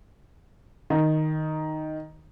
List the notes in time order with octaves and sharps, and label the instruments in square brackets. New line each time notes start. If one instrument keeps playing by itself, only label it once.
[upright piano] D#3